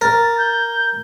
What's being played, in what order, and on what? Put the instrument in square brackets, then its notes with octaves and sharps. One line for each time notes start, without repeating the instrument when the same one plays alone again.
[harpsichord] A#4 [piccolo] A6
[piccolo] G6